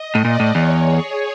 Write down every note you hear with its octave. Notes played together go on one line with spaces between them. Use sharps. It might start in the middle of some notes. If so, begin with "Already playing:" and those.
Already playing: D#5
A2
A#2 D5
A2
E2 C#5
G#4